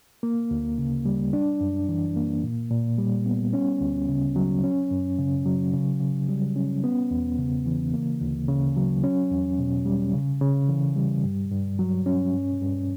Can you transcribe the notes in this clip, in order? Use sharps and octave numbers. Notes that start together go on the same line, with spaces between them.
A#3
D2
C#3
G3
D4
F#2
E3
A#3
A#2
A#2
G3
B3
C#4
D2
C#3
F#3
C#4
F#2
C#3
F#3
C#3
C#3
G3
C#4
B3
E2
C#3
E3
A#3
D2
C#3
F#3
C#4
E2
B2
G3
C#3
C#3
E3
G3
G2
G2
F#3
C#4
G2
G2